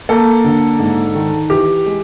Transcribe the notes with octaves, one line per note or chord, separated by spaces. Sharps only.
A#3 A4
D3
G#2
D#3
E3 G4
G#3